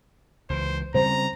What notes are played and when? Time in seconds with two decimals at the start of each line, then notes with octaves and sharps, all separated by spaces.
0.50 C#2 E3 C5
0.94 C#3 G3 C4 C5 A#5